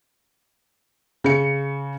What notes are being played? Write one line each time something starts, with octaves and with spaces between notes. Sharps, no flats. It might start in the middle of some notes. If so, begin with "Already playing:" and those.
C#3 C#7